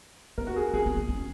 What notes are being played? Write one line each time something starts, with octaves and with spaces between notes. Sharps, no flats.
B3 A#4
F#4
G#4
C#4 G#4
B3
B3
C#4